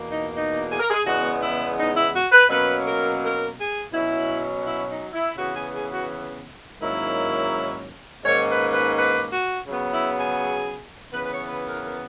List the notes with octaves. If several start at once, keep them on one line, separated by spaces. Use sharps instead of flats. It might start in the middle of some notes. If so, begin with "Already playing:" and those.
Already playing: E2 B2 A#3
D#4
D#4
G#4
A#4
G#4
E2 C#3 G#3 B3 F#4
E4
D#4
E4
F#4
B4
B2 F#3 A#3 C#4 B4
A#4
A#4
G#4
B2 F#3 C#4 E4
E4
D#4
E4
C#3 E3 B3 F#4
G#4
G#4
F#4
G#2 D#3 F#3 A#3 C#4 E4
G#2 D#3 A#3 C#4 C#5
B4
B4
B4
F#4
C#3 F#3 B3
E4
G#4
C#3 E3 B3 B4
B4
C#5
B4
A#4
A#4